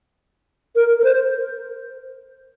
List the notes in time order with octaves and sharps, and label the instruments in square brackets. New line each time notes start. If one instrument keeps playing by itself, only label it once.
[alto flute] A#4
A#4
C5